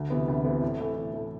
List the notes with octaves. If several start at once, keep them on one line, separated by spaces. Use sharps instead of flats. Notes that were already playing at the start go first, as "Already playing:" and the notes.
Already playing: D2
C3 E3 B3
D2
C3 E3 B3
A2
E3 A3
A2
E3 A3